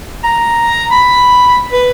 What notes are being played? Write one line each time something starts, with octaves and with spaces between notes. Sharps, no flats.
A#5
B5
B4